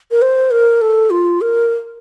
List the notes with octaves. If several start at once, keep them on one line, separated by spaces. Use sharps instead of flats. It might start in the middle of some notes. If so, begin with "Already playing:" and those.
A#4
C5
A#4
A4
F4
A#4